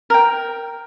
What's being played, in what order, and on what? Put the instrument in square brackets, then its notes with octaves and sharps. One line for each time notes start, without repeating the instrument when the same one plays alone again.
[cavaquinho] A#4 G5